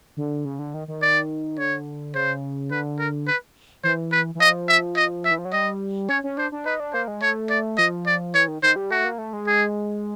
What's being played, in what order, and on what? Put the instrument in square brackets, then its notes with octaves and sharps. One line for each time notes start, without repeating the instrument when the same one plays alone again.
[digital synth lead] D3
C#3
D3
D#3
D#3
[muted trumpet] D5
[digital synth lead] D3 [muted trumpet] C#5
[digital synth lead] C#3 [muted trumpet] C5
[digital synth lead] D3 [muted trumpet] B4
[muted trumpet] A#4
B4
[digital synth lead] E3 [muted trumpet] C5
[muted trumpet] B4
[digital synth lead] E3
[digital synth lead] F3 [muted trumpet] D#5
[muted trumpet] E5
D#5
E5
[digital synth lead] E3
F3
F#3
[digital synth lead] G3 [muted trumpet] D#5
[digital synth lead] C#4 [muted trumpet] C#5
[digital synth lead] C#4
[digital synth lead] D4 [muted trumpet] C5
[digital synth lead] D4
[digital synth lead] D#4 [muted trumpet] B4
[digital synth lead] D4
[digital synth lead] A#3 [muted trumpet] C5
[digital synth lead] G#3
[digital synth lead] A3 [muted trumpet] C#5
[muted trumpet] D5
[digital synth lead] F3 [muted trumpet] D#5
[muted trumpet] D5
[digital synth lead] E3 [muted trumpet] C#5
[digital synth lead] D#3
[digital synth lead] D#3 [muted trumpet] C5
[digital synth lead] G3
[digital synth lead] A3 [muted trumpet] F#4
[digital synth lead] A#3
A3
G#3
[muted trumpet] G#4